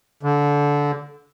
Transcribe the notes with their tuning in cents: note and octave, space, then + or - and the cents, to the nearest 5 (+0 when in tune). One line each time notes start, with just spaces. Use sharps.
D3 -20